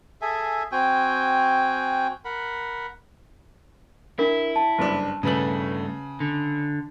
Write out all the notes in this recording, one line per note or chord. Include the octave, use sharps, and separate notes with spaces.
G#4 A4 E5 G#5
C4 F#4 G5 G#5
A#4 F#5 B5
D4 E4 A#4
A5
F#1 G2 D4
G2 C#3 A3 B4 F#7
D3